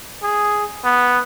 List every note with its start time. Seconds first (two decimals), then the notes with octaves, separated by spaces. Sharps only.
0.22 G#4
0.84 B3